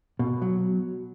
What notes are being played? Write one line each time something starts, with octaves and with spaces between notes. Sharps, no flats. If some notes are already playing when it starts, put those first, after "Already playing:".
B2
F#3